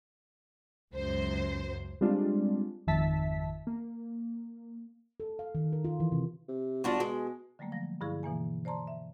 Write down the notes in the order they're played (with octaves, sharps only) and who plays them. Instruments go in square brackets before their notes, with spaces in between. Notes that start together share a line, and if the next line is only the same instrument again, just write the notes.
[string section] C#2 F#2 C5
[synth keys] G3 G#3 C4 D4 F4
G#1 F2 D#3 E5 A5 B6
A#3
[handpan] A4
F5
D#3
A#4
F4
E3
C3
[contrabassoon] C3
[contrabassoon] G1 [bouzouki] D4 F4 F#4
[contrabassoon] B2 [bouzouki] G#3
[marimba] D3 F#3 G3 A3 A#3
F3 A#6
G2 D3 E4 G#4 F5 C#6
B2 E3 A#3 G#5
C5 D5 A5 A#5 C6
E5